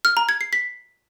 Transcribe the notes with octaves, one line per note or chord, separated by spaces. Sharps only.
F6
A#5
G#6
C7
B6